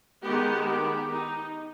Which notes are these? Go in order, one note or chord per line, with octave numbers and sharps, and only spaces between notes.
D#3 G#3 B3 G4
G4
D#4